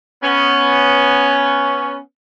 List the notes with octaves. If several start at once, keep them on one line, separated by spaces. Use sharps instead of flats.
B3 C#4